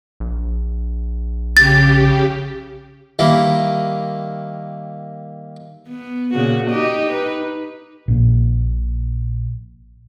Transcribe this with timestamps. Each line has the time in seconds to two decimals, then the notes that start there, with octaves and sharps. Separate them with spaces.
0.20 A#1
1.57 C#3 G4 A6
3.19 D#3 G3 A#3 E4
5.89 B3
6.34 A#2 C#3 F#4
6.70 D#4 G4 D#5
7.08 D#4 B4
8.08 A#1 A#2